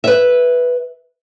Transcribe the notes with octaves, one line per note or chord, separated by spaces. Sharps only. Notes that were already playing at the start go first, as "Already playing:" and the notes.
B4 E5